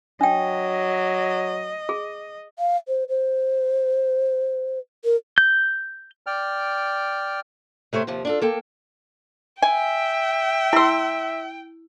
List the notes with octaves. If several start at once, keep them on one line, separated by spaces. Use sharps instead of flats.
F#3 D4 D#5 G5
G#4
F5
C5
C5
A#4
G6
D5 G5 F6
C3 A3 C5 C#5
D#2 C3 F3
D4 F4 A4
A#3 A4 G5
E5 G5 G#5
E4 B5 C6 E6